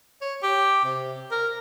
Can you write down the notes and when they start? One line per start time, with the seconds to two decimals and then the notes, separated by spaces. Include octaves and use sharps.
0.21 C#5
0.43 G4
0.85 C3
1.32 A#4